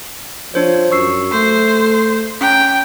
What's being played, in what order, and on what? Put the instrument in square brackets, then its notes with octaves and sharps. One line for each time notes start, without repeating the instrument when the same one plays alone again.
[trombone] F3 [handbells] D4 C5 C#5
[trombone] F#2 [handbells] C#6 E6 C7
[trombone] A3 [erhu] C5
[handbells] C#4 A#5 [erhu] G5